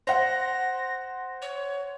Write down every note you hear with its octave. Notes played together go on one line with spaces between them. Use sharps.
C5 F#5 A#6
C#5